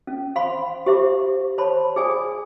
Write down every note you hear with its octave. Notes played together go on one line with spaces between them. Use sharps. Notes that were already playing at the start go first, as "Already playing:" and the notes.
C#4
C5 F5 B5 C6
G4 C5 E5 A#5 D6
C5 C#5 A5 B5 C6
G#4 D5 G#5 D#6